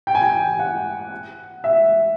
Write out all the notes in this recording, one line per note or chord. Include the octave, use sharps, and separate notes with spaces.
G5
G#5
G5
F#5
E5